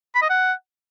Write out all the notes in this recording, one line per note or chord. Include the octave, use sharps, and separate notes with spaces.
B5
D#5
F#5